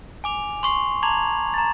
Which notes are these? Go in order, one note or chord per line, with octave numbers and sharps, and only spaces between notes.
G#5 D6 F7
C6 C#6 C7
A5 A#5 D6 G#6 F7 F#7
A#5 A6